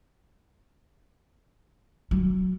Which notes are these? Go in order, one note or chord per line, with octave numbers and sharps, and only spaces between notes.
F#3